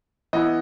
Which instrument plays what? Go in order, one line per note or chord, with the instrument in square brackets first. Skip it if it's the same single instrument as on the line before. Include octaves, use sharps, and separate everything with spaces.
[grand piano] E3 B3 E4 D#5